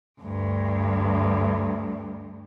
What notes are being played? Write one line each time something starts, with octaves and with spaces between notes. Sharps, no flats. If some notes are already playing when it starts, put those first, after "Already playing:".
D2 G2